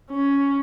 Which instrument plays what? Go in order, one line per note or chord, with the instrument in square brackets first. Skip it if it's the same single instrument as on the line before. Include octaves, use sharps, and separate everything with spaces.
[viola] C#4